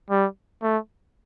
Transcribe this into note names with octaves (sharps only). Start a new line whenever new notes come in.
G3
A3